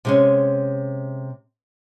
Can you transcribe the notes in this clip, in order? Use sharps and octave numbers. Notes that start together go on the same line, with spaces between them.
C3 G#3 C#4